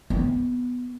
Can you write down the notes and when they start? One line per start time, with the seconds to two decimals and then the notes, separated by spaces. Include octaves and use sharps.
0.10 B3